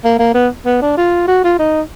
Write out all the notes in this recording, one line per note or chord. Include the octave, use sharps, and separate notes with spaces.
A#3
A#3
B3
B3
D4
F4
F#4
F4
D#4